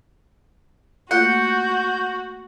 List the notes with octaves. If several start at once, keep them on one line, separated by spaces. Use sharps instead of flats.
A3 A#3 F4 F#4 F#5 G6